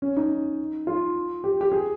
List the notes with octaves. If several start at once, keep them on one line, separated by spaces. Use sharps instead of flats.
C#4
D#4
F4
G4
G4
G#4